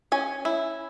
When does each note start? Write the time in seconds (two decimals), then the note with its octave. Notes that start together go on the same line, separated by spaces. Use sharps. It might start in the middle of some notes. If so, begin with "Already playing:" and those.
0.12 C#4 G#5
0.45 E4